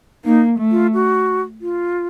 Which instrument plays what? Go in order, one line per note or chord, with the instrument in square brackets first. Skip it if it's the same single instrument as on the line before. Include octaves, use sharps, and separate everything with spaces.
[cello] A#3 [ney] D#4
[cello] A3
[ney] F4
F#4
F4